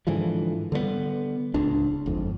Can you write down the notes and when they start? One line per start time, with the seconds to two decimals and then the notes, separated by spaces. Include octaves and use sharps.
0.07 G#2 D3 E3 F3
0.72 D3 G3 G#3 B3
1.54 D1 C#2 D4
2.06 G1 F2 G#2